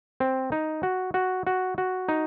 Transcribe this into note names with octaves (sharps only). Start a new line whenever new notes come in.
C4
D#4
F#4
F#4
F#4
F#4
D#4